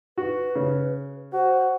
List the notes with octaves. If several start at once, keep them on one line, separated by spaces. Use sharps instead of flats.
F#4 B4
C#3
F#4 C5